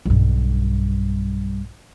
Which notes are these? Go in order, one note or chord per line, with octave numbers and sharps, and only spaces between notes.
B1 G2